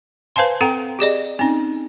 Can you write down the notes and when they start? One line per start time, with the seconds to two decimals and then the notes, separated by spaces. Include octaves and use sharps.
0.36 B4 C5 F5 G#5 A5 C6
0.61 C4 A4 F#5 G5 A#5
0.99 G4 G#4 D5 D#5
1.39 C4 C#4 D#4